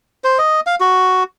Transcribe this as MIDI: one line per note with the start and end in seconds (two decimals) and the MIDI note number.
0.24 0.38 72
0.38 0.60 75
0.67 0.75 77
0.80 1.23 66